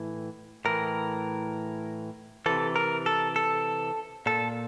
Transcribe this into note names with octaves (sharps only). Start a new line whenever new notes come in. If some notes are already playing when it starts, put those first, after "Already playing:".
Already playing: A2 E3
A2 E3 A#4
C3 E3 A4
A#4
A4
A4
A#2 A4